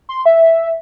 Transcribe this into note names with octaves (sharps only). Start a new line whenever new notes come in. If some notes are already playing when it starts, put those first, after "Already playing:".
C6
E5